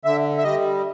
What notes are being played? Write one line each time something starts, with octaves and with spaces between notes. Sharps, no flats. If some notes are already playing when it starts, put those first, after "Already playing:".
D3 E5
E5
G3 D#5